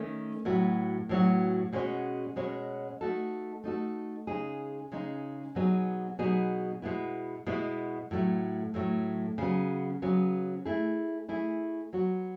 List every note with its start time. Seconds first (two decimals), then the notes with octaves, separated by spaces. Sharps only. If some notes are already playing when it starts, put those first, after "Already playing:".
Already playing: D#3 A3 C#4
0.45 A2 F#3 B3 F#4
1.09 A2 F#3 B3 F#4
1.73 B2 G#3 C#4 F#4 C#5
2.36 B2 G#3 C#4 F#4 C#5
3.01 A3 D#4 F#4 A4
3.64 A3 D#4 F#4 A4
4.27 C#3 G#3 D#4 G#4
4.92 C#3 G#3 D#4 G#4
5.55 B2 F#3 B3 D#4 G#4
6.19 B2 F#3 B3 D#4 G#4
6.82 B2 G#3 B3 E4
7.46 B2 G#3 B3 E4
8.11 A2 F#3 A3
8.74 A2 F#3 A3
9.38 C#3 F#3 B3
10.02 C#3 F#3 B3
10.65 A3 E4 G#4
11.28 A3 E4 G#4
11.93 F#3 B3 F#4